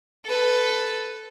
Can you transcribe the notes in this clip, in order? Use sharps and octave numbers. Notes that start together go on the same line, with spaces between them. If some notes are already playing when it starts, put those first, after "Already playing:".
A4 B4